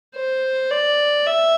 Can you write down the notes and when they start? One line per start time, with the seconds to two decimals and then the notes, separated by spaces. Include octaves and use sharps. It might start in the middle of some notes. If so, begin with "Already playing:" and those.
0.16 C5
0.71 D5
1.26 E5